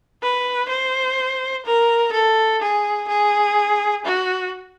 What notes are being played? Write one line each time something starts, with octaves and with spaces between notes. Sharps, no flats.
B4
C5
A#4
A4
G#4
G#4
F#4